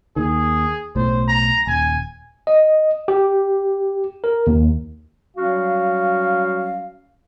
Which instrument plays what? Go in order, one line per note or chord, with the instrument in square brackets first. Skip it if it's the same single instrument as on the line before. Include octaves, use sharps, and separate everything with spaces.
[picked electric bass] D#2 D#3 [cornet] G#4
[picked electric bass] B1 A2 [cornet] C5
[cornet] A#5
[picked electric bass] D#1 [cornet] G#5
[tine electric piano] D#5
G4
A#4
D#2
[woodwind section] F#3 G3 C#4 F#4 F5